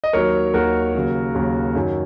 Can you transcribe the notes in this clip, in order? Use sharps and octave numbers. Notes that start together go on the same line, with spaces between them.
D#5
D#2 D#3 F#3 A#4 C#5
D#2 D#3 F#3 F#4 A#4
D#2 C#3 F#3
D#2 C#3 F#3
F#2 D#3 F#3